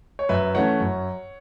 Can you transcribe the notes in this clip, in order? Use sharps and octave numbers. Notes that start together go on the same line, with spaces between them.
C#5
F#2 B4 E5
E3 A3 C#4 C#5 F#5
F#2